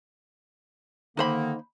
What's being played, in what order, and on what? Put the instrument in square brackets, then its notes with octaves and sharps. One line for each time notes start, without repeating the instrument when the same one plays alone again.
[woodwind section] D3 D#3 A#3 [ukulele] D#4 C5 B5